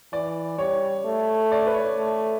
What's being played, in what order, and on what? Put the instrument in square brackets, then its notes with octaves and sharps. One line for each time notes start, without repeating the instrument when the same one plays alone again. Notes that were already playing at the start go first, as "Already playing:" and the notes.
[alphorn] E3 [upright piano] D5
[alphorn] G3 [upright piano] C#5
[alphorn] A3
[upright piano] D5
B4
C#5
[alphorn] A3